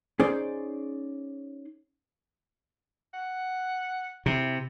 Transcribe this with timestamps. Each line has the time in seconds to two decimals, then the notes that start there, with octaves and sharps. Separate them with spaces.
0.20 C#4 D#4 G#4 C5 D5
3.14 F#5
4.26 C3 E4